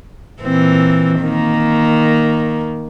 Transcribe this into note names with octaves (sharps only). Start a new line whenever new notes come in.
A#2 E3 C4
D#3 A#3